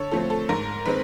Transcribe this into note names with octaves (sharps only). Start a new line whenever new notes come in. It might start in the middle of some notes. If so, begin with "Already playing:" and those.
Already playing: D3 A4 C#5
F3 A3 C4 A4
A4
G#2 A#4
D#3 G#3 C4 B4